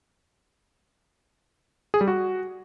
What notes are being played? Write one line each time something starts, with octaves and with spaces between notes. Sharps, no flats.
G#4
G3
F#4